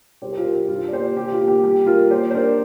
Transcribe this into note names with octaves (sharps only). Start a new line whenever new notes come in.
C2 G4 C5
C5
F4 A#4
C2
G4
G2 F4
D5
A#3 G4 C5
C3 G4
F4
A#3
G4
G3 G4
G3 F4 A#4
A#3 G4 C5
C5
D4 A#4 D5